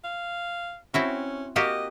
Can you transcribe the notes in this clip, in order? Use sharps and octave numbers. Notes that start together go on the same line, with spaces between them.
F5
C4 C#4 E4 F#4
A#3 F#4 G4 D#5